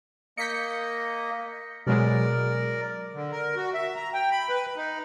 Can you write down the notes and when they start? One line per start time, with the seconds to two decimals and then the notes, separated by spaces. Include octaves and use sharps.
0.38 A#3 D#5 G6 B6 C#7
1.87 B2 F#3 G#3 A#4 D5
3.13 D3
3.32 A#4
3.56 F#4
3.74 E5
3.95 A#5
4.13 G5
4.32 B5
4.50 B4
4.76 D#4